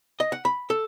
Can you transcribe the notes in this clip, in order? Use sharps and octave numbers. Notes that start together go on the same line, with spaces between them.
D#5
F#5
B5
A4